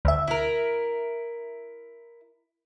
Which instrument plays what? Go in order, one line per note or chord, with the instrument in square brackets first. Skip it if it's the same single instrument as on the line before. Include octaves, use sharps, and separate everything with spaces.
[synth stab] D2 E5
[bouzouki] E4 A#4